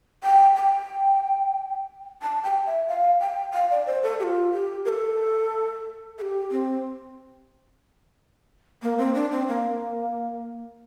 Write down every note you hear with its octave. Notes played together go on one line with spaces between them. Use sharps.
G5
G5
A5
G5
E5
F5
G5
F5
D5
C5
A4
G4
F4
G4
A#4
A4
A4
G4
C4
A#3
C4
D4
C4
A#3